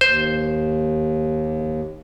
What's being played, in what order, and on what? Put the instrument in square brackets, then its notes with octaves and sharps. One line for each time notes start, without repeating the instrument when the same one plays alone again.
[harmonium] D#2 [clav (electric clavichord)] C5